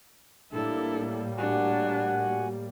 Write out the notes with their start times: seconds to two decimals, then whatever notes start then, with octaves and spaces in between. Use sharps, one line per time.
0.52 A2 G3 A#3 D4 E4 A4
1.38 D4 F#4 G4 F#5 G#5